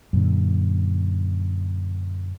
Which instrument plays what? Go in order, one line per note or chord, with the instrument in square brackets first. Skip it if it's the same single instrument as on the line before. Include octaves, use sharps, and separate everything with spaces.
[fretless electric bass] F#2 A#2 D3